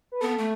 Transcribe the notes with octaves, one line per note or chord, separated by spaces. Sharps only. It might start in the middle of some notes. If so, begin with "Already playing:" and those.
B4
B3 A4
A3